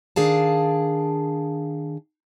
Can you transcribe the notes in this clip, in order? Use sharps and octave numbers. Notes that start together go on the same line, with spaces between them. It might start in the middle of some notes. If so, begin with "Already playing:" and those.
D#3 D4 G#4 F5 A5